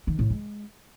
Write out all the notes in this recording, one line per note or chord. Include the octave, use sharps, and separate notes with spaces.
D#3
A2
G#3